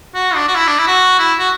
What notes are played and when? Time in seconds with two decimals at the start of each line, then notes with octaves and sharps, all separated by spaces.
0.15 F#4
0.35 D4
0.48 F#4
0.55 E4
0.68 D4
0.78 E4
0.87 F#4
1.19 E4
1.39 F#4